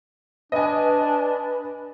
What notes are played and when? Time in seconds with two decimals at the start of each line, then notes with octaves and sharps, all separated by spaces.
0.52 D4 B4 D#5 G#5